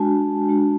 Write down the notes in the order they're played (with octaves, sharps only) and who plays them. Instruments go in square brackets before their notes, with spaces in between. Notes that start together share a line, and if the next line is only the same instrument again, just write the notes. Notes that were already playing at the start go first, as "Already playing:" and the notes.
Already playing: [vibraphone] G#3 D4 F#4 G#5 A5
G#3 D4 F#4